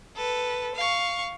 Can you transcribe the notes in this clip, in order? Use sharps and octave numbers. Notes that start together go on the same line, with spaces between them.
A4 B4
F5 C#6